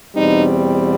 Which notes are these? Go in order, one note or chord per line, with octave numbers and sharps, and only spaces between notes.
E2 B2 G3 C4 D#4